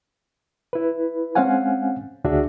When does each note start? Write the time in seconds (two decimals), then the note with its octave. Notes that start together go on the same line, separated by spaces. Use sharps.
0.73 E4 B4
1.35 G#3 C4 C#4 F5 F#5 G#5
2.24 D2 D4 F#4 G#4 E5